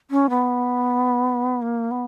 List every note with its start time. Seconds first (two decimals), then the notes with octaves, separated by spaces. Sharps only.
0.11 C#4
0.30 B3
1.62 A#3
1.91 B3